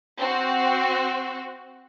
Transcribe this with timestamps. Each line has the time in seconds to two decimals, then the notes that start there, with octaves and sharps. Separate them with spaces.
0.18 C4 F#4